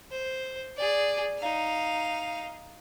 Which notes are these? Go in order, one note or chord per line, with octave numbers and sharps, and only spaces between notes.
C5
G#4 D5
D#4 F5